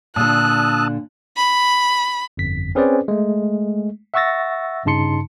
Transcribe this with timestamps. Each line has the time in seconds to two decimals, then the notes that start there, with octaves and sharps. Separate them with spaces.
0.16 A#2 D3 A5 D#6 E6 F#6
1.37 B5
2.37 G1 F2 B6
2.75 C4 C#4 G#4 B4 C5 D5
3.08 G#3 A3
4.14 E5 F#5 C#6 E6 A6 A#6
4.85 G2 C#3 D#4 A5 C6 C#7